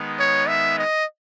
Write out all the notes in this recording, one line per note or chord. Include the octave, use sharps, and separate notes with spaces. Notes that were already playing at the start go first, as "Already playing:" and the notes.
Already playing: D#3 G#3 B3 D#4
C#5
E5
D#5